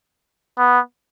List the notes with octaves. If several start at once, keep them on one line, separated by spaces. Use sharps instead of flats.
B3